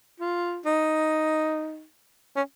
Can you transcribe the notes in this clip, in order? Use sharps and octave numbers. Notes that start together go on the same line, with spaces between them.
F4
D#4
C#4